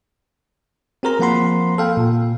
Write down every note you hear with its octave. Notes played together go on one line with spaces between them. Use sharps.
C4 F#4 G#4 A#4 C5 A#5
F3 A#3 C4 F#5 B5 C6
A4 F5 G5
A#2